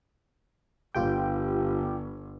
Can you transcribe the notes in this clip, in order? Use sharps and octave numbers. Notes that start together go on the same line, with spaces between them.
G1 F4 G4 G5